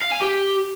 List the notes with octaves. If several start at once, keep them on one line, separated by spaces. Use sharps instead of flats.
F5
G#5
G4